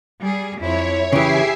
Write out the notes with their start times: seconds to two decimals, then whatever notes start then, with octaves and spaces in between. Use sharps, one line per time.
0.22 G3 G#4
0.62 F2 E4 C#5
1.13 C#3 E3 E4 G4 G#4 E5 G#5 C7